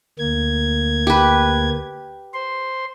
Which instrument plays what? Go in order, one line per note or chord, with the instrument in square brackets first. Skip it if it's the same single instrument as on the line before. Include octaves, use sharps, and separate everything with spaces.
[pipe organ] D2 A#3 G#6
[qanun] G4 B4
[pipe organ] C5 C6